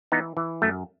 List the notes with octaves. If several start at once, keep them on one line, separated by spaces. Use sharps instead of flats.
E3 B3 D#4
E3
F#2 A3